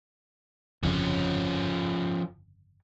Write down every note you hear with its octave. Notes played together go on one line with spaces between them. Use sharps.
G1 F2 C#3 F3 C#4